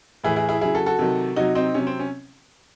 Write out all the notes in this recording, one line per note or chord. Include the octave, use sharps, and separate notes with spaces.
A2 E3 E4 G#4
E4 G#4
E4 G#4
C#3 F#3 E4 G#4
F#4 A4
F#4 A4
C3 D#3 F#3
C3 F#3 D#4 F#4
C4 D#4
C3 F#3 C#4
C4
C#4